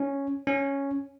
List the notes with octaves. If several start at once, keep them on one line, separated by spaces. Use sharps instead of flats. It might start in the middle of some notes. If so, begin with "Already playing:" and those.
Already playing: C#4
C#4